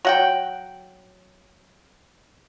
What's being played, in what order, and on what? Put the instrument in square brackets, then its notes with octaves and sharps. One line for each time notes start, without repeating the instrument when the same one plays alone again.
[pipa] F#3 F#5 G5